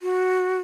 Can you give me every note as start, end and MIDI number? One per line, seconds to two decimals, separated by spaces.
0.01 0.59 66